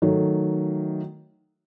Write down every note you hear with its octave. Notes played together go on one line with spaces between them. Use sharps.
D#3 F#3 A3